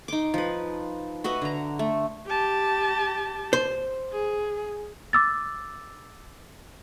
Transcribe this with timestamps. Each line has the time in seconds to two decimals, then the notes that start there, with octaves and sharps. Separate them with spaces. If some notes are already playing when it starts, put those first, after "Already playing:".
0.08 D#4 C6 D6
0.34 F3 B4
1.24 F#4 B4 D#5 E5
1.42 D3 A#5
1.79 A3
2.27 G4 A5
3.53 C5
4.12 G#4
5.13 D6 E6 A6